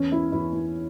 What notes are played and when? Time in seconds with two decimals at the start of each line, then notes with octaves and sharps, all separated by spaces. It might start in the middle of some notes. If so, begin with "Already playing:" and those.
Already playing: E2 C#4
0.12 E4
0.32 E2 E4
0.53 E4